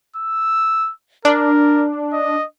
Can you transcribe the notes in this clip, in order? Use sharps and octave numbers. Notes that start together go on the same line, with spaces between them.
E6
D4 A#4
D#5